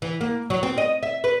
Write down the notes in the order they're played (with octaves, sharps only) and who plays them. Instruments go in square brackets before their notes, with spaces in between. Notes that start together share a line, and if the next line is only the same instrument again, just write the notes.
[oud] E3
A#3
F#3
C4
D#5
E5
B4